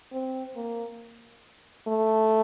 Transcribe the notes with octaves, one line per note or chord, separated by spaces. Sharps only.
C4
A#3
A3